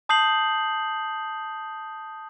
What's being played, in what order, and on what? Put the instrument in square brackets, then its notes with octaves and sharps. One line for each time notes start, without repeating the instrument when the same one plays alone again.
[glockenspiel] A5 D#6 G6 C7 F#7